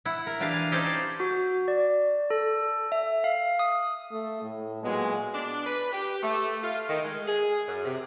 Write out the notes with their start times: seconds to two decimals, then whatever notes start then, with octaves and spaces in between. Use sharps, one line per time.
0.05 E4 F#5
0.26 A#4
0.40 E3 D4 G4 F5
0.53 G#5
0.72 C#4 D#4 G4 A4 C5 D5
1.20 F#4
1.68 D5
2.30 A4
2.92 E5
3.24 F5
3.59 D#6
4.12 A3
4.43 A2
4.84 A#2 F#3 G#3 B3
5.33 D4
5.65 B4
5.92 G4
6.22 A3
6.63 F4
6.89 D#3
7.03 G#3
7.27 G#4
7.67 F#2
7.85 C3